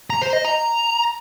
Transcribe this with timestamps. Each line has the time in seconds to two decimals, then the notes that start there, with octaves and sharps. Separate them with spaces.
0.10 A#5
0.22 C5
0.33 D#5
0.44 A#5